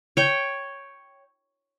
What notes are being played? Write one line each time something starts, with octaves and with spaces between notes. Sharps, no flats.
C#5 G5